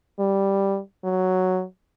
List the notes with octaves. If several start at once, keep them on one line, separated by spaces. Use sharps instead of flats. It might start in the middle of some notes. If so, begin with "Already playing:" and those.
G3
F#3